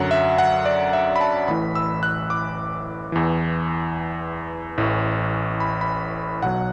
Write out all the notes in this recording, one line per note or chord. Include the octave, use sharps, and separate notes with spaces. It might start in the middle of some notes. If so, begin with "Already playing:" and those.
Already playing: F#2 D3 F#3 F#5
E5
F#5
D5
E5
B5
A5
A1 A2 E3 B5
E6
F#6
D6
E2 E3
A1 A2 E3
B5
B5
B1 B2 F#3 F#5